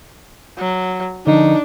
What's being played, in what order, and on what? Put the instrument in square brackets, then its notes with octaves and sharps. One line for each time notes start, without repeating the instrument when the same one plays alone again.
[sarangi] F#3
[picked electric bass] D3 F3 [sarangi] D4 [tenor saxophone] D#4